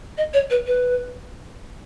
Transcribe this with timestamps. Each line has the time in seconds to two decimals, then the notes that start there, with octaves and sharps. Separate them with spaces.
0.18 D#5
0.34 C#5
0.50 B4
0.67 B4